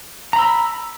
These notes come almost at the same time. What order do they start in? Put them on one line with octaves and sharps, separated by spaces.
A#5 B5 E6